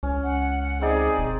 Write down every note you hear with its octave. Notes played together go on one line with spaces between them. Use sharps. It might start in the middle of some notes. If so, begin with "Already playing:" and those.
C#2 C#4
F#5
F#5
C4 D#4 G#4 D5
E1